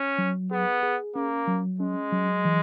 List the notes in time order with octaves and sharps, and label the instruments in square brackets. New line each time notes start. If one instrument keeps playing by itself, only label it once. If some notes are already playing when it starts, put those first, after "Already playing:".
Already playing: [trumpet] C#4
[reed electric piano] F#3
[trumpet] B3 [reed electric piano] G#4
[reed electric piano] G#4
[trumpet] A#3 [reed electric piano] C#4
[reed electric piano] F#3
[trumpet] G#3 [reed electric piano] C#4
[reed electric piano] F#3
E3